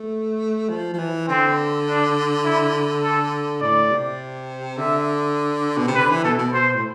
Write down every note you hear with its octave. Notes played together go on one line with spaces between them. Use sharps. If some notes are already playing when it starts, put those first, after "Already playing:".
Already playing: A3
F3
F3
E3
D3 C4
D4
E4
A4
A2 D5
C3
D3 E5
B2
C3
D3 B4
E3
B2 A4
B2
B2 C5
A2